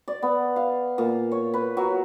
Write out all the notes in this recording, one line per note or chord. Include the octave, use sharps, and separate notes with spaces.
D5
B3
F5
A#2
C#5
B4
F#3